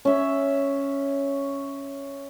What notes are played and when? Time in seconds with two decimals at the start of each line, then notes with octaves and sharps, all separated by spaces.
0.05 C#4 E5